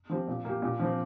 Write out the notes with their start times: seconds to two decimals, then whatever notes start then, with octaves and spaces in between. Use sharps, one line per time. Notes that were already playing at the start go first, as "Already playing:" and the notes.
0.10 F3 C4 G4
0.27 A#2
0.45 A#3 G4
0.62 A#2
0.79 F3 C4